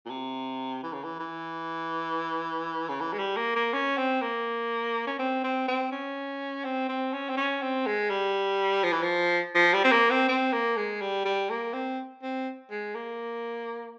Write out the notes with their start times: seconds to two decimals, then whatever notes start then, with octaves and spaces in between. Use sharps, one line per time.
0.06 A#2
0.10 C3
0.83 E3
0.93 C#3
1.04 E3
1.19 E3
2.89 C#3
3.01 E3
3.13 G#3
3.19 G3
3.37 A#3
3.56 A#3
3.73 C#4
3.97 C4
4.22 A#3
5.07 C#4
5.19 C4
5.44 C4
5.68 C4
5.92 C#4
6.64 C4
6.89 C4
7.13 C#4
7.29 C4
7.37 C#4
7.62 C4
7.86 G#3
8.10 G3
8.83 F3
8.92 E3
9.03 F3
9.55 F3
9.73 G3
9.84 C4
9.92 A#3
10.11 C4
10.29 C4
10.53 A#3
10.77 G#3
11.01 G3
11.25 G3
11.50 A#3
11.73 C4
12.23 C4
12.70 G#3
12.95 A#3